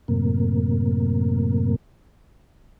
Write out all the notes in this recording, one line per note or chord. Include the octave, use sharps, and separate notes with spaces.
F#2 A2 C3 A#3